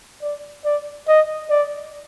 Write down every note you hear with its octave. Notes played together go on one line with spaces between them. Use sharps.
D5
D5
D#5
D5